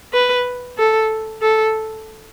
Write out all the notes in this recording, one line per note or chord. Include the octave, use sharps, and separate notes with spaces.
B4
A4
A4